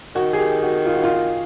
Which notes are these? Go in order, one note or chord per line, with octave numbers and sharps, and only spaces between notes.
D#3 F#4
G#4
G4
F#4
F4
F#4
F4